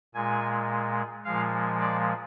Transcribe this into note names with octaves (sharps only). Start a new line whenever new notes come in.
A#2 G#3 G#5
A#2 F3 G#3 F5
D5